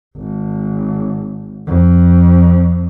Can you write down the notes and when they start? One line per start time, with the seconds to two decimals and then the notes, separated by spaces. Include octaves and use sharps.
0.17 G#1
1.67 F2